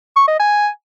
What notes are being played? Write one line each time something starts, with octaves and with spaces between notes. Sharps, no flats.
C#6
D#5
G#5